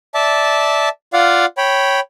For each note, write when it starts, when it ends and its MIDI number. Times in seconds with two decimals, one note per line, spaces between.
0.14 0.89 74
0.14 0.89 76
0.14 0.89 81
1.13 1.46 65
1.13 1.46 74
1.13 1.46 77
1.13 1.46 78
1.58 2.00 73
1.58 2.00 79
1.58 2.00 83